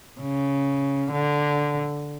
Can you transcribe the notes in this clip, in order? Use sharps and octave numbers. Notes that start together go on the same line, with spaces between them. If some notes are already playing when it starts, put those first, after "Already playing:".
C#3
D3